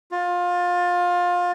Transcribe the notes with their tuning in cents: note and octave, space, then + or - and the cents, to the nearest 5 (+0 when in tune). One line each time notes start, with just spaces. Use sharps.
F4 +25